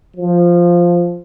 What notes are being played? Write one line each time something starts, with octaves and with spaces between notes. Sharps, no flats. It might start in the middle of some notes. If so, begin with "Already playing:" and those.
F3